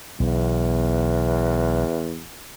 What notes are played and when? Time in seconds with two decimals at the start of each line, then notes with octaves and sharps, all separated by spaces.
0.20 B1 E2